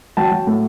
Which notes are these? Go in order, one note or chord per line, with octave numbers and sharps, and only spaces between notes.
F#3 G5 A5
F#3
A2